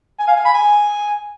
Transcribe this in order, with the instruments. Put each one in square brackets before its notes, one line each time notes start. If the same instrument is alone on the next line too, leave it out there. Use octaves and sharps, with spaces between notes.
[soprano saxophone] G#5
F5
G#5
B5
G#5